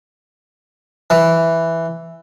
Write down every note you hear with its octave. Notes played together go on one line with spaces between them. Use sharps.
E3